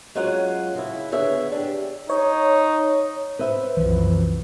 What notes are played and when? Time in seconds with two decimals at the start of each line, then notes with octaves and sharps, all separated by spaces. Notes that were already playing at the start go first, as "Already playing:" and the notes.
0.15 F#3 G#3 C#4 F4 F#5
0.75 C#3 E4
1.12 D3 B3 G#4 C#5 E5
1.52 D4 G4
2.10 D#4 C#5
3.39 B4 C5 E5
3.77 C2 F#2 E3 F3